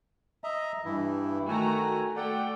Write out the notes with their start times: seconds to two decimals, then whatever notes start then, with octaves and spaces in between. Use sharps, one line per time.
0.44 D#5 E5 A#5
0.85 G2 E3 E4
1.48 D#3 A3 F#4 G#5 A#5
2.16 A3 A4 D5 F#5 G5